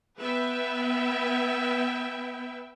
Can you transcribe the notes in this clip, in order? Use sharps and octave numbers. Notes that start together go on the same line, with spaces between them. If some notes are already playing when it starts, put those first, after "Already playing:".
B3 B4 E5 G5